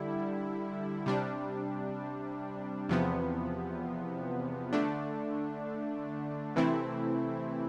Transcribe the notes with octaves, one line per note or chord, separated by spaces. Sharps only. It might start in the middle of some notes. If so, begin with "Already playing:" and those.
Already playing: D3 G3 E4
C3 G3 D4
E2 C3 F3 B3
D3 A3 D4
C3 E3 A3 C4 E4